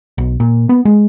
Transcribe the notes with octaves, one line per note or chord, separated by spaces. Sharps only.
B1
A#2
B3
G#3